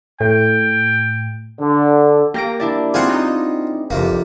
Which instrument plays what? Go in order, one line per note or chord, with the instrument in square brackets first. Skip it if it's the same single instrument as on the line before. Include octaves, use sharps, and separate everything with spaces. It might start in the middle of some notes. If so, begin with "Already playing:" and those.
[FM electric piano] A2 [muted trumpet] G5
[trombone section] D3
[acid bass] A#3 [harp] G4 A#6 D7
[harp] D4 E4 D5
[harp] C4 G#4 [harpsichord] F4 C5 F#5
[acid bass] D#4
[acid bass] F#1 [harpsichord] F2 C3 A#3